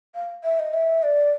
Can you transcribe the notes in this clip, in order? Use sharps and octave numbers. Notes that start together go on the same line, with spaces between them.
F5
E5
D#5
E5
D5